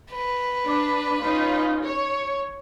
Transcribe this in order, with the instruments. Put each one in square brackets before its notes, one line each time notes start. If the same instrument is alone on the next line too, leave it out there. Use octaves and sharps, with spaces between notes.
[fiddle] B4
[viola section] D4
C#4 D#4 F4
C#5